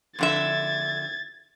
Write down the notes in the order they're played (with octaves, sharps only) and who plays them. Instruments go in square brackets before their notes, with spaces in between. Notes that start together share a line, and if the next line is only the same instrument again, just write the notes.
[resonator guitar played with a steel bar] F2 D3 E5 [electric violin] G#6 A6